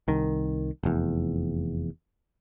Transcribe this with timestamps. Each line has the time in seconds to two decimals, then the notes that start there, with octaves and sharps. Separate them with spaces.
0.08 C2 D#3
0.83 F1 E2